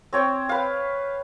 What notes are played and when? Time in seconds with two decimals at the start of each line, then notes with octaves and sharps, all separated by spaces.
0.13 C4 C#5 G5
0.49 B4 F5